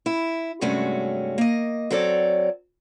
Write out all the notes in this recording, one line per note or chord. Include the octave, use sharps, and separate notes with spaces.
E4
G2 C3 G#3 A3 C#4 F#4
A#3 D#5
F#3 C4 A4 C#5 D5